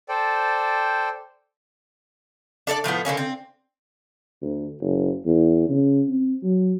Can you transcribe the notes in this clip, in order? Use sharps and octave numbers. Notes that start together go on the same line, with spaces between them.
A4 C5 D5 G5
D4 A4 C#5 D5
A2 F3 A3 B3
D3 E3 A#3 C#4
C4
D2
F#1
E2
C#3
C4
F#3